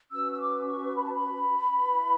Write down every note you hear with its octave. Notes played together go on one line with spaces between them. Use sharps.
C#4 F#4 B4 E6
E6
D6
C#6
B5
A5
B5
E4 B4